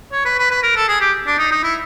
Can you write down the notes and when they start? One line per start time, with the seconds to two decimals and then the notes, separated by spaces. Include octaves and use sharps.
0.12 C#5
0.25 B4
0.38 B4
0.51 B4
0.63 A#4
0.76 A4
0.88 G#4
1.00 G4
1.27 D4
1.38 D#4
1.51 D#4
1.63 E4